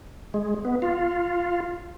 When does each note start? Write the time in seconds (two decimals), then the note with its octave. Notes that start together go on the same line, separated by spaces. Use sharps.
0.34 G#3
0.65 B3
0.82 F4